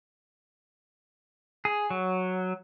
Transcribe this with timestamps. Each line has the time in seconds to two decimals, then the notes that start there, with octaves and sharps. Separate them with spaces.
1.65 G#4
1.90 F#3